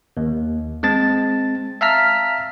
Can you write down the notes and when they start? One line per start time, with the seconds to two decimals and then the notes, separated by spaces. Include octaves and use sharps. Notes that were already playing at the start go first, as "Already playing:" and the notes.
0.17 D#2
0.83 G#3 C4 A5 A6
1.81 E5 F5 A5 A#5 F6 B6